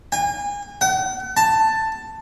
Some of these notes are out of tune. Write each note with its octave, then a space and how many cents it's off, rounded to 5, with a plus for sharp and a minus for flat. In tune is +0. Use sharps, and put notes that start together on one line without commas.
G#5 -35
F#5 +40
A5 +10